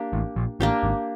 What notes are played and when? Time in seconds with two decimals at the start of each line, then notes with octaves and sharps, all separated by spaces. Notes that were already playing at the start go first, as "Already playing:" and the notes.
Already playing: A#3 D4 G4
0.13 A1 A2
0.36 A#1 A#2
0.60 A1 A2 A#3 D4 G4
0.83 G#1 G#2